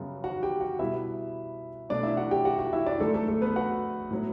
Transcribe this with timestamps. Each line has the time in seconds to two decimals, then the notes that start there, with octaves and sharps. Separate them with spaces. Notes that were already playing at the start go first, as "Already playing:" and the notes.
Already playing: F#2 C#3 G3 B3
0.24 F#4 F#5
0.43 G4 G5
0.61 F#4 F#5
0.79 B2 G3 B3 E4 E5
1.89 B2 F#3 A3 D4 D5
2.03 E4 E5
2.17 F#4 F#5
2.31 G4 G5
2.45 F#4 F#5
2.59 F#4 F#5
2.73 E4 E5
2.86 D4 D5
3.00 F#2 D3 A3 A4
3.14 A3 A4
3.28 A3 A4
3.41 B3 B4
3.56 F#4 F#5
4.11 A2 F#3 B3